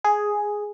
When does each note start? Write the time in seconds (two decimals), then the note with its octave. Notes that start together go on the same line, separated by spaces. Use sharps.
0.04 G#4